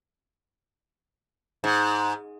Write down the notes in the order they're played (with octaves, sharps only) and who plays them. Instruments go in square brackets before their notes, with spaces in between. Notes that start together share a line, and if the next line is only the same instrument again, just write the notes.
[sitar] G#2